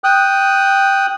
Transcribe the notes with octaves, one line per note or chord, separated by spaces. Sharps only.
G5 D#6 F#6